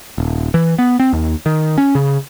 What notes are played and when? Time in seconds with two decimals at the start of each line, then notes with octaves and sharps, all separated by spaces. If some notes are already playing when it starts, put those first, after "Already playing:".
0.18 D#1
0.54 E3
0.78 B3
1.00 C4
1.13 D#2
1.46 D#3
1.78 C#4
1.95 C#3